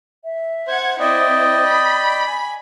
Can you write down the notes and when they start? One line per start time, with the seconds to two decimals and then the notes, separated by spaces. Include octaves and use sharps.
0.24 E5
0.67 C5 F#5 G#6
1.00 C4 E4 D5 D#5 G5 D#6
1.67 B5
2.27 G#5